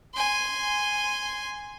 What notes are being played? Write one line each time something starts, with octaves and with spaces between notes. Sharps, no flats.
G#5 C6